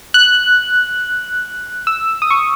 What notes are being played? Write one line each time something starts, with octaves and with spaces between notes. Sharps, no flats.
F#6
E6
D#6
C#6